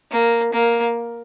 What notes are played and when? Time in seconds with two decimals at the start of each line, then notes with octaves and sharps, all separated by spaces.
0.12 A#3
0.53 A#3